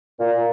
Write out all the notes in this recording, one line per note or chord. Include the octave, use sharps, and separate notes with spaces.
A#2